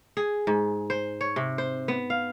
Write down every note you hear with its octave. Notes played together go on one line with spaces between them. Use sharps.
G#4
G#2
C5
C#5
C3
C5
B3
F5